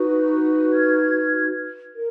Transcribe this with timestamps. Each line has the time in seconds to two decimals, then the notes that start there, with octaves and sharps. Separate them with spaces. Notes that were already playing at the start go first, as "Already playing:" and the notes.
Already playing: D#4 F#4 B4
0.72 F6 G#6
1.95 A#4